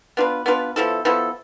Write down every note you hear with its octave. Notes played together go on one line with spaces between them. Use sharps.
B3 D4 F4 B4
B3 D4 F4 B4
F3 B3 E4 A4
F3 B3 E4 A4